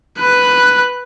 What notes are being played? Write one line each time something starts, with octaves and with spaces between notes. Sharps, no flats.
B4 F#6